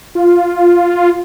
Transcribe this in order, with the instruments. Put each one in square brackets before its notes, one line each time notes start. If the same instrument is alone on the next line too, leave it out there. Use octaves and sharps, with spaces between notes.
[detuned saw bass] F4